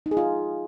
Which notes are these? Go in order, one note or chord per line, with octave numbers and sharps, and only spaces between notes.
D#4
G#4
F4